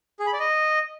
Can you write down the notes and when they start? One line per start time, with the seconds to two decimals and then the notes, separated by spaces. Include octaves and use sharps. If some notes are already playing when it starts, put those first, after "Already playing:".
0.20 G#4
0.26 B5
0.33 D5
0.40 D#5